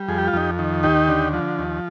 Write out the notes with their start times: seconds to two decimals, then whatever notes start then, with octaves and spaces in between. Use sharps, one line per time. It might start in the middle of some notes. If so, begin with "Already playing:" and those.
Already playing: G3
0.08 F2 G#4
0.18 G4
0.28 F4
0.33 F2 D#4 G4
0.59 D#3
0.83 D#2 D#4 G4
1.08 D3
1.33 F3
1.59 D#2